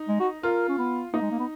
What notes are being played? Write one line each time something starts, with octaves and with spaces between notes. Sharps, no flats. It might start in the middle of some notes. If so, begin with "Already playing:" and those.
Already playing: D#4
G#3
F#4
F4 A#4
C#4
B3
A#3 D#4
G#3
A#3
B3